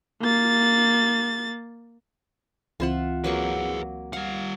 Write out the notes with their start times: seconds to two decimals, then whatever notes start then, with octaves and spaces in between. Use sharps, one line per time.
0.22 A#3 A6
2.80 C#2 E3 C4 F4 E5 F#5
3.24 F#3 A#3 G#4 B4 C#6
4.13 G3 F5 F#5